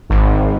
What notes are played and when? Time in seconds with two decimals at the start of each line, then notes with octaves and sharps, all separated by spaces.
0.10 G#1